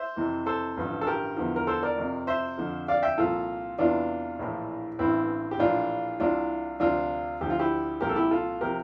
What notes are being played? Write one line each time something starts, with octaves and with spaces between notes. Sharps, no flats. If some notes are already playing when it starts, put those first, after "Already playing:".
Already playing: C5 E5
F2 C3 E3
A4 C5
A1 G2 D3 F3
A4
G4 A#4
E2 D3 F3
A#4
A4 C5
A#4 D5
F2 C3 F3
C5 E5
F2 D3 F3
D5 F5
E5 G5
C2 A#2 F3 F4 A4
E2 C3 E3 D4 F4
A#1 A2 E3
A1 G2 E3 C4 E4
G4
A#1 A2 E3 D4 F4
C2 C3 E3 D4 F4
D2 C3 F3 D4 F4
D2 D3 F3 G4
F4
E4 G4
C2 A#2 F3 G4 A#4
A4
E4 G4
F4 A4
C3 F3 G4 A#4